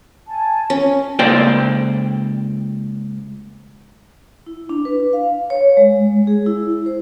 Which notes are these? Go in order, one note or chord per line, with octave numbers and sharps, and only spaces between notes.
G#5 A5
C#4
C#2 A#3 C5 D5 G5
E4
D4
B4
F5
C#5
G#3
G#4
E4
C5